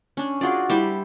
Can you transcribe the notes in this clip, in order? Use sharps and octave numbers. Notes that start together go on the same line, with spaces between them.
C#4 D4
F4 F#4 G#4 D5
G3 E4 C5